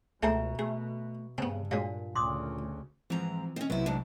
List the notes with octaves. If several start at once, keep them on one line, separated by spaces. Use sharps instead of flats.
C#2 B2 A3 G#4 C5 E5 G#5 A#5
A3 G#4
G2 C#3 B3 C4 G#5
A#2 F#3 G#3 D4 F5
D2 A#2 C#3 C6 D6 D#6
G#2 E3 F3 C4 A#5
C4 C#4 D#5
B1 C3 F#3 B3 E4
D2 G#2 D4